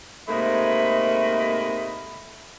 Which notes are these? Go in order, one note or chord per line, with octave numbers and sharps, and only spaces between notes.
G#2 C3 A3 A#3 D#5 B5